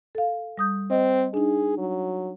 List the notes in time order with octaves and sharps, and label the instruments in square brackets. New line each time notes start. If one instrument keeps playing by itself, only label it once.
[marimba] A4 F5
G3 D#6 G6
[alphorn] C4 [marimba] D#5
[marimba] D4 D#4 [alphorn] G#4
[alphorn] F#3